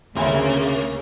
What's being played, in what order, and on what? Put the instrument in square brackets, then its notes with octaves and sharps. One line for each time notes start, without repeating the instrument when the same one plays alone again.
[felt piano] D2 [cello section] C#3 [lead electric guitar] A#3 [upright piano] E5 G#5 C6